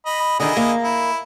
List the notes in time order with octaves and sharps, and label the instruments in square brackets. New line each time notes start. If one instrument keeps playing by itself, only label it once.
[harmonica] D#5 B5
[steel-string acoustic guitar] D3 D#3 [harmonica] E4 G#4 D#5
[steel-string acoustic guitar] A#3
[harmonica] E4